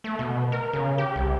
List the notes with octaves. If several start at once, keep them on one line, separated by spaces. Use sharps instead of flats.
A3
B2
A#4
C#3
G4
C2